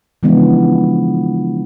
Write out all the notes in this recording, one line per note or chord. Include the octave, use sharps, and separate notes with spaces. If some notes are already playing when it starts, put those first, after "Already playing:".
C#3 E3 F3 G#3 B3 D4